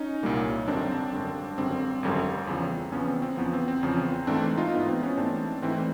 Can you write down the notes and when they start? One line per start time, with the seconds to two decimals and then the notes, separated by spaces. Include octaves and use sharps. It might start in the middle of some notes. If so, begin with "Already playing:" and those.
Already playing: C#4 D#4
0.23 C2 A#2 G3 A#3
0.68 G#1 F#2 D3 G3 C4 D4
1.13 G#1 F#2 D3 G3
1.58 G#1 F#2 D3 G3 C4
2.03 G#1 F#2 D3 G3
2.47 E2 C#3 F3
2.92 E2 C#3 F3 B3 C#4
3.08 C4
3.22 C4
3.37 E2 C#3 F3 B3
3.53 C4
3.68 C4
3.83 E2 C#3 F3
4.27 G#2 E3 A3 C4 D4
4.58 D#4 F4
4.73 G#2 E3 A3 B3
4.88 C4
5.03 B3 C#4
5.18 G#2 E3 A3 C4 D4
5.62 G#2 E3 A3 C4